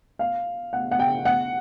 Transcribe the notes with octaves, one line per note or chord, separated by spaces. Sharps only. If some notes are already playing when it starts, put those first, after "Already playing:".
F5
F#5
F#5
G5
F#5